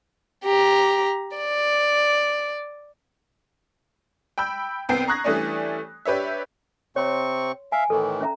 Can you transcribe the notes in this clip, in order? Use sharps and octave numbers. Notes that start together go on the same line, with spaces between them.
G4 A#5
D5
G5 B5 E6 G6
C2 B3 C4 G5 C7
A#5 C#6 D#6 F#6 G#6 A#6
E3 G3 A3 C#4 D4
D4 G4 B4 C#5 E5
C3 C4 C#5 C6 C#6
E5 F5 G#5
A2 D#3 E3 A4
C#4 E5 A#5